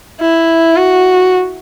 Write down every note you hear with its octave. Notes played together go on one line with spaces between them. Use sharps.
E4
F#4